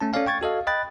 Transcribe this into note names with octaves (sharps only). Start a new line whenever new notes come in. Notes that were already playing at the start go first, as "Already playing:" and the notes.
A3 C#4 A5
C#4 A4 C#5 D5 F5 G#5
G5 C#6 G#6 A6
F#4 A4 D#5 F5
D#5 G5 B5 F#6 A6